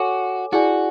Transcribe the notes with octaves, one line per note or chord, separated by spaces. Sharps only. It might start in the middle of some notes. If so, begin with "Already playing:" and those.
Already playing: F#4 A4 C#5 G#5 D6
E4 F#4 G#4 D5 G#5